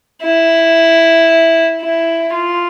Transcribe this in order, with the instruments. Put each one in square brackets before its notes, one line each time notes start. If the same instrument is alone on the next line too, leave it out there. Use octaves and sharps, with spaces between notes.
[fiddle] E4
E4
F4